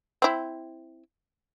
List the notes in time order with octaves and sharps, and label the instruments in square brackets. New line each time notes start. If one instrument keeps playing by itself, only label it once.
[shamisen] C4 E4